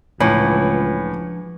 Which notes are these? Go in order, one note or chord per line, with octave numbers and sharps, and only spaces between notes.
C#2 A2 E3 F3 D4 F#5